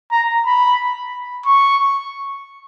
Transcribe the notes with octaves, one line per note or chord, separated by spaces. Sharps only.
A#5
B5
C#6